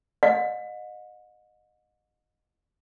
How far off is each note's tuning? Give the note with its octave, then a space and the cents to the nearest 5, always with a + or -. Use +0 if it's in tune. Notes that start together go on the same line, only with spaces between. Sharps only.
D#5 -15 F#5 -45